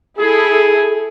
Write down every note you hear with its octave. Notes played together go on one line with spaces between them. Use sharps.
E4 G#4 A4